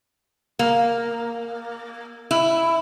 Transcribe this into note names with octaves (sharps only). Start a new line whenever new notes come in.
A#3
E4